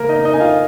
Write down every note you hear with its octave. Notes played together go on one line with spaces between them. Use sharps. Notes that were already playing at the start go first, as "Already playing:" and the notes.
Already playing: A#3 A#4
D#4 D#5
D#4 D#5
G#5
F4 F5